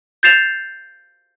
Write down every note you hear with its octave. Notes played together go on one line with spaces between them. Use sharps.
G6 A6 C7 E7 F7